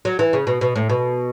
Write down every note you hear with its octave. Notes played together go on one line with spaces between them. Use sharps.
F#3
E3
C#3
B2
B2
A2
B2